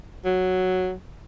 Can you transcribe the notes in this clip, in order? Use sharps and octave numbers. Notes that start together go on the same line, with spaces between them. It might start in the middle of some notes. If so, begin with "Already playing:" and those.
F#3